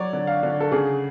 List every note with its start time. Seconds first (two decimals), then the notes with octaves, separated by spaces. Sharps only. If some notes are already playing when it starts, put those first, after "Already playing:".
Already playing: F#3 C#5 D5
0.13 D3
0.27 F5
0.43 D3
0.60 A4
0.72 C#3 G#4